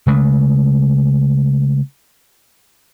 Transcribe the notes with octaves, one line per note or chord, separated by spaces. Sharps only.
C#3 G#3 A3